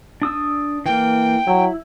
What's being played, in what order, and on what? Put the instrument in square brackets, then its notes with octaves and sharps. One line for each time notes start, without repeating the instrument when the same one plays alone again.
[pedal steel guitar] D4 D#6 E6
[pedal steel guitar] E3 A#3 [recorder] G5
[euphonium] F#3 [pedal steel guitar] E4